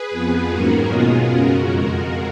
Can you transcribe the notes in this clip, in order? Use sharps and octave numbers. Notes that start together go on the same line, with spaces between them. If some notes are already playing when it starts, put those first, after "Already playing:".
Already playing: G#4 B4
F2 F3 B3
G#2 D#3 F#3 A#3 C#4 F#4 A#4
B2 G#3 B3 F4 G#4
F#2 C#3 G#3 C#4 F#4 A#4
F2 F3 G#3